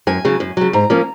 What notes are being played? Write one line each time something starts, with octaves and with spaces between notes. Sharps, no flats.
F#2 G#5
C#3 F#3
F#2
C#3 F#3
G#2 A#5
F3 A#3 C#4